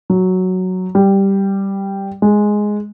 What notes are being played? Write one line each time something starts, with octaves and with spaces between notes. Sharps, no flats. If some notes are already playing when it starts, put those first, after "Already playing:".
F#3
G3
G#3